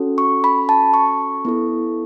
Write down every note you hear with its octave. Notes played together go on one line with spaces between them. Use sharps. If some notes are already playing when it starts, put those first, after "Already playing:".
Already playing: C#4 F#4 A4
C#6
B5
A5
C#6
B3 E4 A4